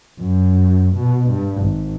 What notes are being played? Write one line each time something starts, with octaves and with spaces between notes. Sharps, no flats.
F#2
B2
G2
G#1